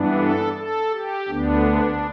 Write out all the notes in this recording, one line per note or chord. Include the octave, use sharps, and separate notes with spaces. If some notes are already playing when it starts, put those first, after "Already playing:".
Already playing: G2 E3 B3 D4
A4
A4
G4
D2 D3 B3 D4